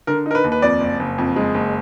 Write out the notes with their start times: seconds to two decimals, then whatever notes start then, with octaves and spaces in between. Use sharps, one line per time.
0.07 D3 A#4
0.26 D#4 A#4
0.35 B4
0.44 D#2
0.52 B4
0.62 F2 D5
0.81 F#1
1.00 F#1
1.18 F2
1.36 G#3
1.54 F#1